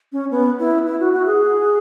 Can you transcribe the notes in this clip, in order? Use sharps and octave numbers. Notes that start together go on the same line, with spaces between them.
C#4
B3
E4
E4
F#4
F#4
G#4